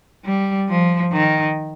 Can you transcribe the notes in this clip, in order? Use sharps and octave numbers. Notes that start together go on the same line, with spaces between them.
G3
F3
D#3